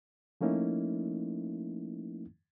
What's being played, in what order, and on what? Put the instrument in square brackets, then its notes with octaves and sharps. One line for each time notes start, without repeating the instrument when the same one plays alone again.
[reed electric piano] F3 A3 A#3 C#4 D#4 E4